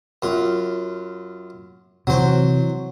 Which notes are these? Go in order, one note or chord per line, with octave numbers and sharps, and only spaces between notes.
F#2 F4
C3 E3 F#3 C5